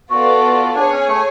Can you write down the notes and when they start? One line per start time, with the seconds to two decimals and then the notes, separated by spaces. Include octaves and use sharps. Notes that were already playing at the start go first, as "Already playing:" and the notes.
0.10 B3 F4 F#4 A4 D5
0.75 D4 G#4 C#5 G#5
0.92 C#4
1.07 A3